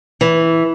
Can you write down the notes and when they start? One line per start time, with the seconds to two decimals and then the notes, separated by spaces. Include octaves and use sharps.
0.21 E3